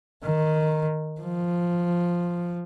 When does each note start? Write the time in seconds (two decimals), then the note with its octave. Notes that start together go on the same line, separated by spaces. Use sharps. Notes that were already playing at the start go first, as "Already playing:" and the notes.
0.24 D#3
1.21 F3